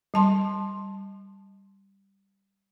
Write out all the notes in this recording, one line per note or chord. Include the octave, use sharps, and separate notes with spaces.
G3 A5 C6